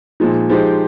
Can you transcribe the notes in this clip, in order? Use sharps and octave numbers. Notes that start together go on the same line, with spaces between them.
A#2 F3 G#3 D#4
F3 G#3 D#4 G4 C5